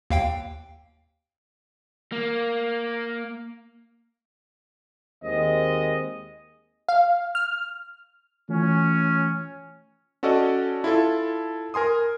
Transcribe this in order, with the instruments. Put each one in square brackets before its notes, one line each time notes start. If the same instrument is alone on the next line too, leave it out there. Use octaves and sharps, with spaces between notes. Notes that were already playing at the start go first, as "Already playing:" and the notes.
[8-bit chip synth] D#2 F5 G5
[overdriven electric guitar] A#3
[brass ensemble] D#2 G#3 C4 D#5
[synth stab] F5
F6
[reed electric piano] E3 A3 F4 [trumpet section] C#4
[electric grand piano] C#4 F#4 A4 D5 D#5
E4 F4 A4
A#4 G#5 C6 D#6